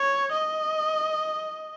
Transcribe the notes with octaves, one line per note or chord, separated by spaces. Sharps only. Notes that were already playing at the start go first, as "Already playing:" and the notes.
Already playing: C#5
D#5